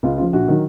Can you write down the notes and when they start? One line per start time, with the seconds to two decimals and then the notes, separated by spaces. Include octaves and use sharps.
0.03 C#2 F4
0.18 C#3 F3 F4
0.33 A#1 F#4
0.48 D#3 F#3